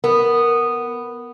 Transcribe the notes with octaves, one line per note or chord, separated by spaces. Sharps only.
B3 A#4